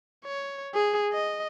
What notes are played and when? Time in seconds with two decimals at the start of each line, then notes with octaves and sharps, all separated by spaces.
0.25 C#5
0.74 G#4
1.13 D#5